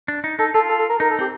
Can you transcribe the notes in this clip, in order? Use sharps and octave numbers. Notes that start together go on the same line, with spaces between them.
D4
D#4
D#4 A4
F4 A4
A4
A4
A#4
D#4 A#4
A4
C4 G4